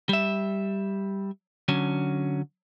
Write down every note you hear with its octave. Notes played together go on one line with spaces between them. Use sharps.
G3 E5
D3 F#3 C#4